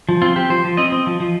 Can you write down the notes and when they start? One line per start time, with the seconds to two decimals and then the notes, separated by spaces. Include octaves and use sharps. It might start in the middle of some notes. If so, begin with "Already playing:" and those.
0.09 F3
0.22 C4 F4
0.36 C4 G4
0.50 F3 C5
0.65 F3
0.77 C4 D#5
0.92 C4
1.07 F3
1.20 F3